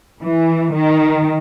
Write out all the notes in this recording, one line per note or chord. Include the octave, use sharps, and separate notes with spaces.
E3
D#3